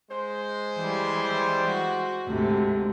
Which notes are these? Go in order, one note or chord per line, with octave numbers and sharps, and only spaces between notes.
G#3 C5
E3 G3
F#4
D2 G#2 C3